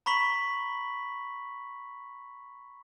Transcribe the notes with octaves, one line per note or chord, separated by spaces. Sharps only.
A#5 B5 C#6 B6 F#7